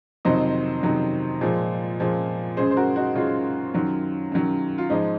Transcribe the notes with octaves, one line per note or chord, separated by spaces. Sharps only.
F2 C3 D#3 F#3 C5 D#5
F2 C3 D#3 F#3
A#2 F3 G#3
A#2 F3 G#3
F#2 C#3 G#3 G#4 C5
C5
F#4 A#4
D#4 F#4
F#2 C#3 G#3 C#4 F4
F#2 D#3 F#3
F#2 D#3 F#3
F4
G#2 F3 G#3 D#4